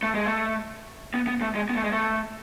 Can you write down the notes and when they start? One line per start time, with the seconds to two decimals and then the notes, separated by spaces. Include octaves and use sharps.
0.03 A3
0.15 G#3
0.27 A3
1.14 B3
1.27 B3
1.42 A3
1.55 G#3
1.69 B3
1.76 A3
1.84 G#3
1.92 A3